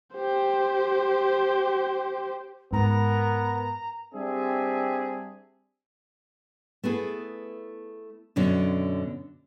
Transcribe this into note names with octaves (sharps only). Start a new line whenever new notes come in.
G4 C5
G#2 B3 A#4 A#5
G3 C4 D4 G4 G#4 E5
A3 B3 E4 G#4
F#2 B2 D3 C#4 D4